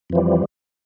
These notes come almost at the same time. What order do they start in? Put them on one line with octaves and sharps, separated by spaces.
F2 E3 F3 G3